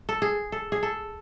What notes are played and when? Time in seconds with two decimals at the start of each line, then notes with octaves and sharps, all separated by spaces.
0.09 A4
0.22 G#4
0.52 A4
0.72 G#4
0.83 A4